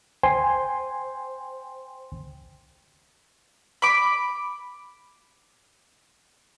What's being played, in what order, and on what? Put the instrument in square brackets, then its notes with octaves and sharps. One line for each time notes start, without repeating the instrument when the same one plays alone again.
[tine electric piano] C5 G5 G#5 C6
[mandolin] B5 D6